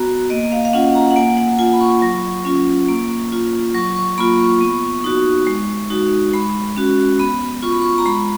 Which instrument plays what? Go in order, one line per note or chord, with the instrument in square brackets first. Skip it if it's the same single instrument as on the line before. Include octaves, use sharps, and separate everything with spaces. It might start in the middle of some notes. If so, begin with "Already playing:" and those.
Already playing: [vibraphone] B3 F#4 A#5
A#3 D#5
F5
F5
C#4 F4 F#5
A#5
F#5
A#3 G#5
F#5
F4 G#5
B5
C#6
F#3
C#4 F4
A#3
F4
F#3 C#6
C#6
A#3 F4 B5
C#6
B3
D#4 F#4
G#3
D#4 F#4
G#3 B5
C#4 F#4
B3 B5
F4 C#6
B5
C#6
A#5
G#3 B5